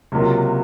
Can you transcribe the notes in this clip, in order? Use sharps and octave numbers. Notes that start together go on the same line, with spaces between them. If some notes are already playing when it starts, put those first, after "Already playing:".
C#2 C3 F#3 A#3 F4